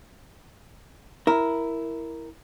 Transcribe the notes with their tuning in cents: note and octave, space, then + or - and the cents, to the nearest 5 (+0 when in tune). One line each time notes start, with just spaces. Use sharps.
E4 +0 A#4 +0